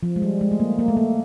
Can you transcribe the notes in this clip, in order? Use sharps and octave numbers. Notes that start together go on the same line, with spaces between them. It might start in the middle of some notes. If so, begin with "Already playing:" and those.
F3
G#3
G3
G#3
A3
A#3
A#3
A3
A#3